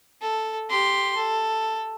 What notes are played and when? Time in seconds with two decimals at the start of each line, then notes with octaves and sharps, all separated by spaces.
0.21 A4
0.69 G4 C6
1.15 A4